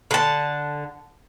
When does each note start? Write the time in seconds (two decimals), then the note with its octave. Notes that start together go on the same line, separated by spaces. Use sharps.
0.11 D3 A5